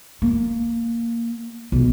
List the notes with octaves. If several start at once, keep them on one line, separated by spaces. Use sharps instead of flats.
A#3
B1